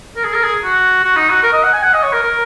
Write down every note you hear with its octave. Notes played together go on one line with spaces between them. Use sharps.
A#4
G#4
A#4
G#4
F#4
F#4
D#4
F#4
A#4
D#5
F#5
G#5
F#5
D#5
C#5
A#4
A#4